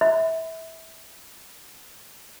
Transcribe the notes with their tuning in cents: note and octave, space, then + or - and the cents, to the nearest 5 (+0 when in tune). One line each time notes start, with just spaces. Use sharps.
E5 -25 B5 +35